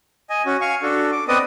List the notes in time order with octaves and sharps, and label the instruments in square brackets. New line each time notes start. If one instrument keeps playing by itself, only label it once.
[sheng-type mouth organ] D#5 G#5
C#4 F#4
F5 G#5 C#6
D4 F#4 A4
D6
B3 C4 B4 D5 D#5 D#6